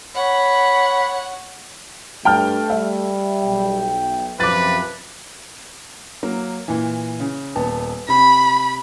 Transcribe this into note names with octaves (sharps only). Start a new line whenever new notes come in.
C#5 F#5 B5
G2 A3 G5 A5 F6
G3 E5
B1 G5
F#2 C3 F3 F4 B4 D6 A6
F#3 A#3
A#2 E3
C#3
D#1 B3 A5
C3 B5